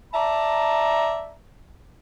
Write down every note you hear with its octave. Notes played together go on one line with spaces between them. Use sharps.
D5 E5 A5 A#5